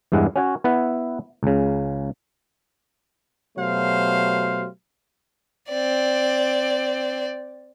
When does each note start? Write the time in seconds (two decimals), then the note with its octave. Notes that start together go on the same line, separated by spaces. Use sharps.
0.12 E2 G2 G#3 E4 F#5
0.36 C#4 F#4 C#5
0.64 B3 E4 B4 E5 F#5
1.43 C#2 C#3
3.57 B2 F#3 A3 G4 C5 F5
5.69 C4 D5